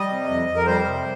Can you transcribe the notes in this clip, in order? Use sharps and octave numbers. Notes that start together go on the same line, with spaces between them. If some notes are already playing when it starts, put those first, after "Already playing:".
Already playing: G3 D#5
C3
F2
F2
A#4
G3 C5
C3